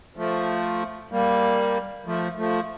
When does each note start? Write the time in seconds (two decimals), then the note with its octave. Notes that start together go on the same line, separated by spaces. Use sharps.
0.17 F3 A3
1.12 G3 A#3
2.06 F3 A3
2.38 F3 A3